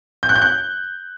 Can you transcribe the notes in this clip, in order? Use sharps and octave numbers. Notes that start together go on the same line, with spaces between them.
G6
F#6
G6
F#6